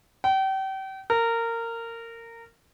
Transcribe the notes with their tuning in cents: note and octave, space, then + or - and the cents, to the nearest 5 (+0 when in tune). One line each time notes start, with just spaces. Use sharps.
G5 -35
A#4 -20